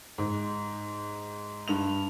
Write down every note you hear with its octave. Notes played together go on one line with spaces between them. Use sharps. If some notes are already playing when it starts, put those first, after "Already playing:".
G#2
G2 F7